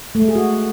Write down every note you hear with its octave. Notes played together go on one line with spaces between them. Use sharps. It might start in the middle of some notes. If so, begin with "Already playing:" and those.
A3
G#3
G#4
F#4